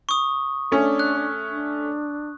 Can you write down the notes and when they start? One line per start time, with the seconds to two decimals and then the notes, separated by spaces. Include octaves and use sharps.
0.09 C#6 D#6
0.72 A3 C#4 D4
0.99 F#6
1.50 D4